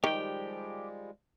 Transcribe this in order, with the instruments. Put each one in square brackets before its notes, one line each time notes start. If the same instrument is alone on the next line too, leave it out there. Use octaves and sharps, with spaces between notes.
[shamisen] D#3 [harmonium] F3 G3 G#3 [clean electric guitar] G4 G5